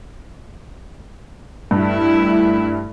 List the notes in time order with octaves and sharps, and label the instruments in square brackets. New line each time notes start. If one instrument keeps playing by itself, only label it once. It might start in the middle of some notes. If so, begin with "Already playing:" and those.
[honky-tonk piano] G2 [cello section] A3 E4